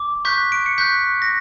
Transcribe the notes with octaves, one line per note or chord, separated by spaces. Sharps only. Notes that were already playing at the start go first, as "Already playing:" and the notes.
Already playing: D6
C#6 F#6 G6 B6
D7
C#7
C#6 F#6 G6 B6
A#6